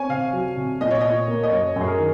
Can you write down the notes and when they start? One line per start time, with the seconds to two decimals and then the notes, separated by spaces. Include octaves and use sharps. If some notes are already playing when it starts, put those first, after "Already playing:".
Already playing: C4 C#5 G#5
0.09 C3 F5
0.33 F#3
0.57 C3
0.81 A#2 D#5
0.91 C#5
1.00 A#2 D#5
1.28 A#3
1.43 D#5
1.52 F#2 C#5
1.76 F#2
1.81 G#4
1.87 A#4
1.99 D#3